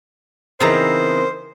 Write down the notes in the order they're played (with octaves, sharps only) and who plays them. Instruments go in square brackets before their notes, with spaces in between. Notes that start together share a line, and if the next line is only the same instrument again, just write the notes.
[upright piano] C#3 E3 D#4 [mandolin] B3 C4 A#5 [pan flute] A#4 [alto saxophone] C5